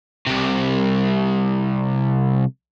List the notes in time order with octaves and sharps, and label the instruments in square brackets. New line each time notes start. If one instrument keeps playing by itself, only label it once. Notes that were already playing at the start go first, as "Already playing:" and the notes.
[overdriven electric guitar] C2 C3